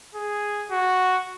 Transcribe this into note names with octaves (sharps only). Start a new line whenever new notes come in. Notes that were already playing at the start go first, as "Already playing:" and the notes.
G#4
F#4